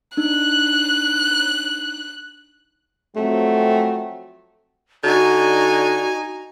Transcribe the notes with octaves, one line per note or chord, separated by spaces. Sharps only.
D4 D#4 F#6
F3 F#3 A3 C4
D3 D#4 F#4 G#5